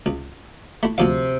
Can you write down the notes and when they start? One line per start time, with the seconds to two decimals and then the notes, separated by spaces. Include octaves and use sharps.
0.06 C#2
0.83 A3 E4
0.98 D2 C3 F3 F5